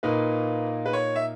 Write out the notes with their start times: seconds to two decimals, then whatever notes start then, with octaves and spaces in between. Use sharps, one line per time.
0.03 A#2 A#3 D#4 B4
0.86 B4
0.93 C#5
1.16 E5